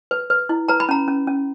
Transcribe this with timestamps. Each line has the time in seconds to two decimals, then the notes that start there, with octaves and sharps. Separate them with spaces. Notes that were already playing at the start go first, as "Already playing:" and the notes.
0.11 B4
0.30 B4
0.49 E4
0.68 B4 A#5
0.80 B5
0.89 C#4 A#5
1.08 C#4
1.27 C#4